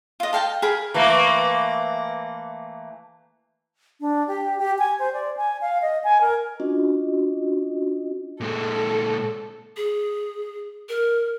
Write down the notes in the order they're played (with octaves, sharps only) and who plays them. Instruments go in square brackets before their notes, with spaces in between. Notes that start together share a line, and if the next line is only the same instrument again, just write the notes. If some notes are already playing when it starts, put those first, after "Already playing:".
[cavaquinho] F4 D#5
A4 F5 G5 A5
G#4 A#4 B5
[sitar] E3 A3 A#3
[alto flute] D4
G4
G4
G#5
C5
D5
G#5
F5
D#5
G#5
A#4
[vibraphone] C#4 D4 F4 F#4 D#5
[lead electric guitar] A#2 G#3 [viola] A4
[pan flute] G#4
A#4